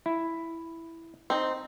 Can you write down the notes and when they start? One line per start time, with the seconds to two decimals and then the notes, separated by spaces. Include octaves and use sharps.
0.06 E4
1.30 C4 D#4